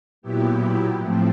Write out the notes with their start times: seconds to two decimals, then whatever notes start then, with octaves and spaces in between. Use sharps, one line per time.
0.22 A#2 F#3 B3 E4 G4
0.98 A2 F3 A3 C4